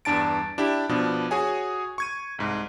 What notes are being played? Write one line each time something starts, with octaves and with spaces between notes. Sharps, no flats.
E2 G2 D4 A5 A6 D7
D4 E4 G4
B2 F3 B3 D4
F#4 G#4 C#5 G#5
C#6 G#6 D#7
C2 G#2